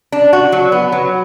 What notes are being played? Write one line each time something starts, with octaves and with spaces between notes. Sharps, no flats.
D4
F#4
F#3
B3
F#3